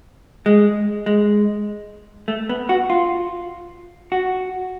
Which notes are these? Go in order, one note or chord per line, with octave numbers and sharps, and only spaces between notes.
G#3
G#3
A3
B3
F#4
F4
F#4